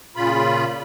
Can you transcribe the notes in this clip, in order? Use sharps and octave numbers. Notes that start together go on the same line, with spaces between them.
A#2 C#3 F4 B5